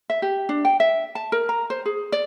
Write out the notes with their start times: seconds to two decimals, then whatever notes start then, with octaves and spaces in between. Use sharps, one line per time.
0.10 E5
0.22 G4
0.49 D4
0.65 G5
0.80 E5
1.15 A5
1.32 A#4
1.49 A#5
1.70 C5
1.86 G#4
2.12 D5